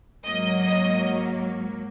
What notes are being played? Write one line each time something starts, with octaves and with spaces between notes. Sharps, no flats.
G#2 F#3 A#3 D#5
D#5